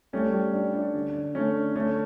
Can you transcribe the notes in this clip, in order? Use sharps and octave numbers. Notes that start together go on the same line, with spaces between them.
G3 A3 C#4
G3
D4
D4
D3
D3
D3 A3 C#4
D4
D3 A3 C#4